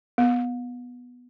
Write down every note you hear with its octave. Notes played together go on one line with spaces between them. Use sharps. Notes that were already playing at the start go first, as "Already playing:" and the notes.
B3